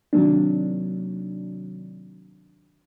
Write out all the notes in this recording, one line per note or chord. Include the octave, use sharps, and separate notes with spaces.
C3 D#3 F#3 A#3 D4